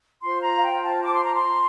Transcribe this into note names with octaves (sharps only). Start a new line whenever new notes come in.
F4 C5 C6
A#5
F5
G5
A5
D6
C6
A#5
C6